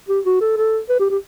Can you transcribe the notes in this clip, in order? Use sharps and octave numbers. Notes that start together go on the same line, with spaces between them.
G4
F#4
A4
A4
B4
G4
G4